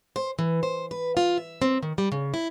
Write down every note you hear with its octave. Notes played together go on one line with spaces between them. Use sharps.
C5
E3
C5
B4
F4
E5
C4
D#3
G3
C#3
E4